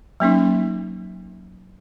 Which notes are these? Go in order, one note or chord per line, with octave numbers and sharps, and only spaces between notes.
F#3 A#3 C#4 D#4